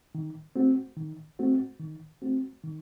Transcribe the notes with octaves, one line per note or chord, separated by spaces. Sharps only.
D#3
A3 C4 F#4
D#3
A3 C4 F#4
D#3
A3 C4 F#4
D#3